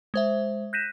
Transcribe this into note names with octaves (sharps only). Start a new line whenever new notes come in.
G#3 C5 E5
F#6 G6 A#6 B6 D#7 E7